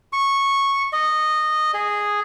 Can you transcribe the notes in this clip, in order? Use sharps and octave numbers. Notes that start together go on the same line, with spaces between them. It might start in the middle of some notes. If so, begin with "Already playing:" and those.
C#6
D#5
G#4